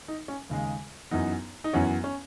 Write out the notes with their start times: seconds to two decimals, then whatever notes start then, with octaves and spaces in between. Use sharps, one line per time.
0.08 D#4
0.28 C#4
0.50 D#2 C#3 G#3
1.11 F#2 E3 B3 D#4
1.64 D#4
1.73 F#2 E3 B3 C#4
2.04 C#4